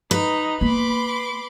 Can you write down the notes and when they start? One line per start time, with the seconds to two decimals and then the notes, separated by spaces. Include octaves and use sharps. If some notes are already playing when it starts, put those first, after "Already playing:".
0.11 D#4 B4
0.61 A#3 B5 C6 D6